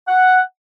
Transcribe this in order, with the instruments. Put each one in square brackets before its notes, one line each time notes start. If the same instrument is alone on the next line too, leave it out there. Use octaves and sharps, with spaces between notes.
[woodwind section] F#5